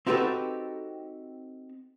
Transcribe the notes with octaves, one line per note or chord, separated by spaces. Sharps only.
C4 D#4 F#4 G4 A4 B4